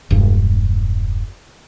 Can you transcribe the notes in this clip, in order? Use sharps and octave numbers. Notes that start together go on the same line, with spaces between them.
E1 G2